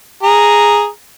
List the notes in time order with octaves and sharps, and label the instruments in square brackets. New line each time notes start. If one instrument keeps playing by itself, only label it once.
[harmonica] G#4 A#5